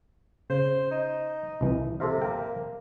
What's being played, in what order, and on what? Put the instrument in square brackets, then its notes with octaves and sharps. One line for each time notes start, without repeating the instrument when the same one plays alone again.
[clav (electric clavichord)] C#3 [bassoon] C5
[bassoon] D#4
[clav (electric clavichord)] C2 E3
[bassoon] C3 [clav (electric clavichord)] A4 C5 F5
[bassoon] A#3 [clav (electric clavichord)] A#4 G5